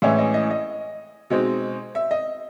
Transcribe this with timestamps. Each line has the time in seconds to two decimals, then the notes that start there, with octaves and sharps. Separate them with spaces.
0.02 A2 E3 G#3 C#4 E5
0.19 D#5
0.34 D#5
0.51 D#5
1.30 B2 G#3 C4 D#4
1.95 E5
2.11 D#5